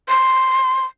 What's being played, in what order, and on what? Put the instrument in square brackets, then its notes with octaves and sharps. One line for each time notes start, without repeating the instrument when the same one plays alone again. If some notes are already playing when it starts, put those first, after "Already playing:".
[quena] C6